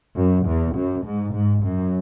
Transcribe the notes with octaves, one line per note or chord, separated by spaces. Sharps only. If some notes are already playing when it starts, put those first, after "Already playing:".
F#2
E2
F#2
G#2
G#2
F#2